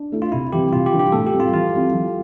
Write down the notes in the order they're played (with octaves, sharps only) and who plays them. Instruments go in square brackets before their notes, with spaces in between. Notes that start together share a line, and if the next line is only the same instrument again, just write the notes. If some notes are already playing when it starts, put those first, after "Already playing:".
Already playing: [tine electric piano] D4
[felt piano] A3 E4
[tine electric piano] F4
[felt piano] C3 [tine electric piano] E4
[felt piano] E3 G3 C4 [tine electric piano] G4
[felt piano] C3 [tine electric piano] F4
[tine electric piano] G4
[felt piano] E3 G3 D4 F4
[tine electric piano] G4
[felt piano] A2 [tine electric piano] A4
[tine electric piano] G4
[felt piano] G3 C4
[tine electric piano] F4
[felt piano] E3 [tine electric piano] F4
[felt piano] G3 C4 E4
F3